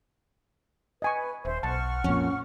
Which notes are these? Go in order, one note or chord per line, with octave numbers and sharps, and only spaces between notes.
B4 D#5 G#5 C#6
D#1 C5 E5
B1 F#5 A5 C#6 F6
F2 A#2 C#4